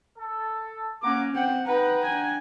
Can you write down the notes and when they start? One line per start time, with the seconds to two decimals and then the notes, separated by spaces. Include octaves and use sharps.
0.17 A4
1.02 A#3 C#4 F#5 A#5 D6
1.33 C4 G4 F#5 G5
1.66 D#4 B4 F#5 G5 A#5
2.06 D4 G#5